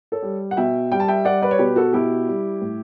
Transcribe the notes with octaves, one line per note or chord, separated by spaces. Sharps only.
A4 C#5
G3
F#5
B2 E5 G5
G3 G5
A5
E5 G5
G3 D5 F#5
B4 D5
C#5
B2 G4 B4
F#4 A4
B2 E4 G4
G3
A2